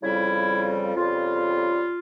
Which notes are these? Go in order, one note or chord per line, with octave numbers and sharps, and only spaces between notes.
F2 C#3 G3 E4
F2 C#3 G3 F4